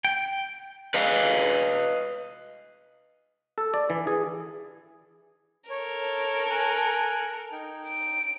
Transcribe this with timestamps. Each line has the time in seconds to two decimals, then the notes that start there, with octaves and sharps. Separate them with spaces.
0.05 G5
0.94 B4 D#5 F5
3.58 A4
3.74 D5
3.90 E3
4.07 G#4
5.70 A4 A#4 C#5
6.50 G#5 F#6
7.52 D#4 G5
7.88 D7